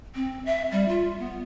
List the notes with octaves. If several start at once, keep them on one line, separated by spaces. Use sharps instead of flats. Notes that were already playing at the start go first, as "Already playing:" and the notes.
C4
E5
G3
F4
B3